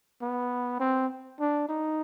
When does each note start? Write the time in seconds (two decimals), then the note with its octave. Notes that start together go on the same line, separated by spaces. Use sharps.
0.22 B3
0.80 C4
1.40 D4
1.69 D#4